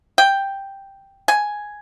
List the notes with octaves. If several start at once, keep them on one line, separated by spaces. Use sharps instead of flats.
G5
G#5